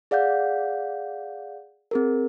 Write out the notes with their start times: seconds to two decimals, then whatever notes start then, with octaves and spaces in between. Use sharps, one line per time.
0.11 G#4 D5 F5 F#5 G6
1.91 C4 G#4 A#4